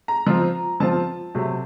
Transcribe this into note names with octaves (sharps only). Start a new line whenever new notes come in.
A#5
F3 C4 F4
F3 C4 F4 A5
C3 F#3 A3